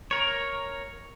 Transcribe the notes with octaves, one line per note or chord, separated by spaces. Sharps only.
A#4 C#5